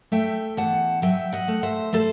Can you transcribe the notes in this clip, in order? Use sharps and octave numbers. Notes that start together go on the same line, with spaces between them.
A3 E5 G5
E2 F#5 A5
F#3 E5 G5
D#5 F#5
A3
C5 E5
A3 A4 C5